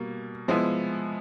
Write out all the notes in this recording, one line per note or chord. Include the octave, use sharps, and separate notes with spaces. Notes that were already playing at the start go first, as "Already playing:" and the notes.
Already playing: B2 G3 A#3
F3 G#3 B3 E4